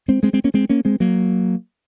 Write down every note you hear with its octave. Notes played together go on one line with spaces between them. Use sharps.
G#3 C4
G#3 C4
G#3 C4
A#3 C#4
G#3 C4
A#3 C#4
G#3 C4
F#3 A#3